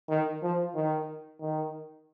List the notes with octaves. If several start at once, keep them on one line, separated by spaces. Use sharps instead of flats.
D#3
F3
D#3
D#3